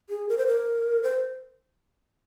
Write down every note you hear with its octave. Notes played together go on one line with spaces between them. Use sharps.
G#4
A#4
C5
A#4
C5